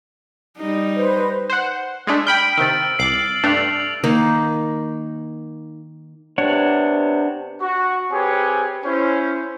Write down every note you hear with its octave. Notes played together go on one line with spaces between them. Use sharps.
G3 D#4
B4 C5
C5 F#5
G#3 A3 D4
G5 B5 F6 G6 D7
C3 D#3 E6 A6
C2 D6 C7 F#7
G2 A3 D4 F7 F#7
D#3 A#3 D#4
C3 B3 D4 C#5 F#5
F#4 C#6
C4 G4 G#4 B4 C#5 G#5
C#4 E4 C5